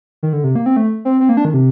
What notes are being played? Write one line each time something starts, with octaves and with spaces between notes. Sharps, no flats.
D#3
D3
C3
A#3
C4
A3
C4
C4
A#3
D4
D#3
C3